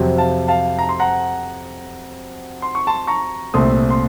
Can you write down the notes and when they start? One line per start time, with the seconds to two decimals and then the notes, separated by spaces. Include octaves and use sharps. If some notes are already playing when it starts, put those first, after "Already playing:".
Already playing: F2 C3 F#3
0.18 F5 A5
0.48 F5 A5
0.79 A#5
0.89 C6
1.00 F#5 A#5
2.62 C6
2.75 C#6
2.87 A5 C6
3.07 A#5 C#6
3.54 C2 A#2 A3 C4 C6 D#6
3.90 C6